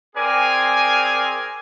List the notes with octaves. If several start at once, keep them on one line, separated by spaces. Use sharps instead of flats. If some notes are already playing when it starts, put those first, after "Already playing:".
C4 G#4 A#4 D5 G#5